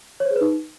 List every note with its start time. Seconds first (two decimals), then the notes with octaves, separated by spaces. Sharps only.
0.20 C#5
0.25 C5
0.31 G#4
0.36 B4
0.41 D#4